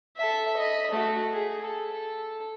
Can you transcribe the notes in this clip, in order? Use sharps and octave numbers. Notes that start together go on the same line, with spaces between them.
A4 E5
D#5 B5
A3 F#4
G#4
A4
A4